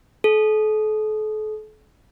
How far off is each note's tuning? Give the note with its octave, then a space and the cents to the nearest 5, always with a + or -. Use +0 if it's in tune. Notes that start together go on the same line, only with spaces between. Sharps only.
A4 -40